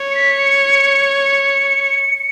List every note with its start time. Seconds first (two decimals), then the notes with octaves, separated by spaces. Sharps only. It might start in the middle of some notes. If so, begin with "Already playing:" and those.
Already playing: C#5
0.11 C#7
0.15 B6
0.38 C#7
1.25 C#7